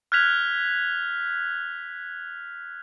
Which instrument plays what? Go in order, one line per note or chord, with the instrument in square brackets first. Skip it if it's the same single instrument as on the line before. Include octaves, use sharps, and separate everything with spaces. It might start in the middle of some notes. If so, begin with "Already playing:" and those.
[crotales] F6 F#6 G#6 B6 F7